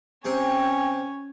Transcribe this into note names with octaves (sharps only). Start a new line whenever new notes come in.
C3 C4 C#4 G5 G#5